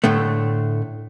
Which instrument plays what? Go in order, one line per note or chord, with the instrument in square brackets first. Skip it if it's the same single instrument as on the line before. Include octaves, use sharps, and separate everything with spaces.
[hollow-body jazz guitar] A2 D3 A3